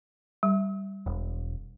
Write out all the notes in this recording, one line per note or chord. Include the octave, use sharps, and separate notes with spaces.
G3
E1